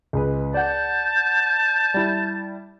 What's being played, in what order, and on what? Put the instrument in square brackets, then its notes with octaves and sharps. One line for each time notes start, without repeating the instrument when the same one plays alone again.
[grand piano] C#2 G#3 B4
[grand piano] D5 F#5 [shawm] A5 [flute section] G6
[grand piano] G3 E4